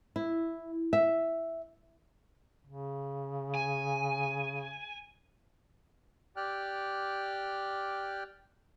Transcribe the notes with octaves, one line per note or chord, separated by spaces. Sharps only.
E4
E5
C#3
G#5
G4 D5 G5 F6 F#6